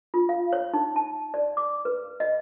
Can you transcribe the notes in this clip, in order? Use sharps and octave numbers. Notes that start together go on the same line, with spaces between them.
F4
F5
C#5
D#4
A5
D5
D6
B4
D#5